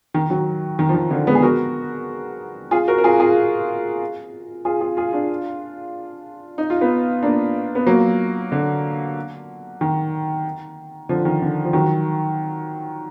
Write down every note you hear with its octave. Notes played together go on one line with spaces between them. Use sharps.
D#3
D#3 F#3
D#3
F3
D#3
D3 F3
G#3 B3
G#4
F#4 A#4
F4 G#4
F#4 A#4
A#4
F4 G#4
F4 G#4
F4 G#4
F4 G#4
F4 G#4
D4 F4
D#4
F4
B3 D#4
A#3 D4
B3
F#3 A#3
D3
D#3
D3 F3
D#3
D3
F3
D#3 F#3